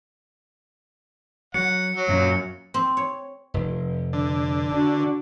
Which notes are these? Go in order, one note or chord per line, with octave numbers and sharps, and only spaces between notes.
F#3 F#5 C#7
F#3
F#2 A#2
C4
C#5
F1
D3
D4 F#4